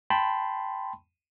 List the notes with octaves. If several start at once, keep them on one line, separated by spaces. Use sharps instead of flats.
G5 A5 B5 C6